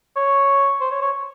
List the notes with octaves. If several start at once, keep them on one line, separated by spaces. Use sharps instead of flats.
C#5
C5
C#5
C#5